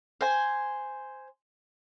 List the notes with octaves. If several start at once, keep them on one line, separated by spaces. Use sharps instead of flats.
C5 G#5